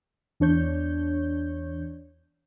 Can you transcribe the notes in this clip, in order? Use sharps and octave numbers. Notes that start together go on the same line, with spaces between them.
E2 D4 C#5 G6